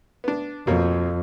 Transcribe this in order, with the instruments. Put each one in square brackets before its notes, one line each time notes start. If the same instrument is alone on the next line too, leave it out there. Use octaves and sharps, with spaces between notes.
[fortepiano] B3 D4
[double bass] F2 [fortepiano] B2 A#3 C#5